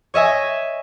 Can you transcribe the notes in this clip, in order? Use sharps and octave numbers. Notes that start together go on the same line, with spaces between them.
C#5 D#5 E5 G#5